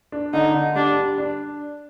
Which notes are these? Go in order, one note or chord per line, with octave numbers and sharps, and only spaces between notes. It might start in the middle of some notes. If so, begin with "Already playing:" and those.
D4
D3 D#4
D3
G3 D4
D4
D4